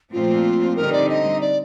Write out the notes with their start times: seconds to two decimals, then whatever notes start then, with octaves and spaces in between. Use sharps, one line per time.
0.12 A#2 F3 A3 C4 F4
0.76 D3 G3 C4 D#4 A#4
0.93 D5
1.09 D#5
1.41 D5